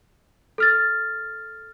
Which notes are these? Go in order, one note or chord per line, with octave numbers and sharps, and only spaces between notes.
A4 F6 A6